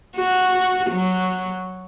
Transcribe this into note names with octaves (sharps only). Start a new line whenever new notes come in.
F#4
F#3